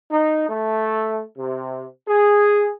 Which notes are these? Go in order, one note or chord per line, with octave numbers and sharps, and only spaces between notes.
D#4
A3
C3
G#4